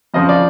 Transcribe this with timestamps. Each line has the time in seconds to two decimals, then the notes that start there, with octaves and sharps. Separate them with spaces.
0.14 F2 C#3 F3 D#5
0.29 D5